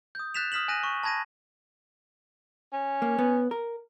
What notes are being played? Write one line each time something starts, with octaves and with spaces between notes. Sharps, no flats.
D#6 G6
F#6 G6 A6 B6 E7 F7
D#6 F6 B6 E7 F#7
G#5 F#6 A#6 D#7
C#6
A5 B5 G#6 A#6 D#7
C#4
A#3
B3
A#4